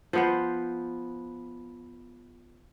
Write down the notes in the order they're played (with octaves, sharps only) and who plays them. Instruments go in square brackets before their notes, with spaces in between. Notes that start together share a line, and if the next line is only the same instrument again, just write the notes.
[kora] F3 B3 C5